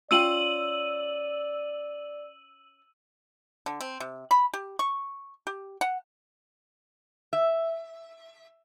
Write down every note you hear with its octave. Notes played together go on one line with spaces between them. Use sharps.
C#4 F4 D5 G5 E6 D#7 F#7
D3
C4
C3
B5
G4
C#6
G4
F#5
E5